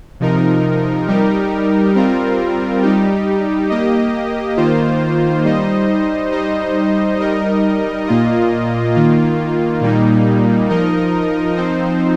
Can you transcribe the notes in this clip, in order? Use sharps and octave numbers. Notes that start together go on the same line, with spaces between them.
C3 F3 D#4 A#4
G3 D#4 G4 A#4
G3 C4 F4 A#4
G3 D#4 G4
A#3 G4 D#5
D#3 A#3 F4 C5
G3 D#4 C5 D#5
G3 D#4 C5 D#5
G3 D#4 A#4 D#5
A#2 A#3 F4 D#5
D#3 A#3 F4
A#2 G3 A#3 D#4
F3 D#4 A#4 D#5
F3 C4 D#4 C5